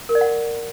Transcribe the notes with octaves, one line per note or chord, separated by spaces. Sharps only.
A#4
D5
F#5